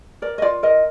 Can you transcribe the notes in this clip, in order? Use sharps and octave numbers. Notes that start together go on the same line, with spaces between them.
A#4 D5
D#5
F4 D5
A#4 D#5